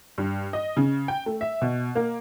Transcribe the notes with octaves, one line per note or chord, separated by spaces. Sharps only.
G2
D#5
C#3
G5
A3
E5
B2
A#3